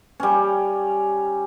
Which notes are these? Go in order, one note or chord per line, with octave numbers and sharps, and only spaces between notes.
G3 C#4